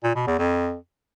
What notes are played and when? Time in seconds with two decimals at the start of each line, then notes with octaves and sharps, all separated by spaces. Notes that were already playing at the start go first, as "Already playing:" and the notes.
0.04 A#2
0.15 B2
0.27 E2
0.39 F2